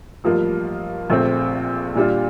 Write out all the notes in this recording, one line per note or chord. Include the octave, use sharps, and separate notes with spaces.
A1 G2 F3 A#3 F4
A#1 A#2 A3 C4
A#2 G3 D4 F4